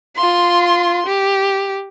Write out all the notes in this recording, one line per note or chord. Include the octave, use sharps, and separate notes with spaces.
F4 C6
G4